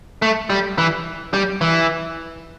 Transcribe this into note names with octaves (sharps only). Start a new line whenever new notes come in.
A3
G3
E3
G3
E3